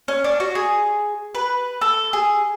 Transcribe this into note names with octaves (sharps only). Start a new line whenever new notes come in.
C#4
D4
F#4
G#4
B4
A4
G#4